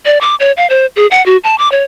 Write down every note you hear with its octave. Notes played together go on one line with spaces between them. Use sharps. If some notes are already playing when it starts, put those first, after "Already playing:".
D5
D6
C#5
F5
C5
G#4
F#5
F#4
A5
D6
C#5